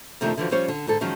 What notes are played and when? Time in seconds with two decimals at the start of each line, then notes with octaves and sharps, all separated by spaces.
0.21 F2 C3 D#3 F3 A3 D4
0.37 D3 E3 F3 F#4
0.51 F3 G3 C#4 C5 C#5
0.68 D3
0.87 G#2 D3 A4
1.01 D#3 F3 F#3 G#3 C#4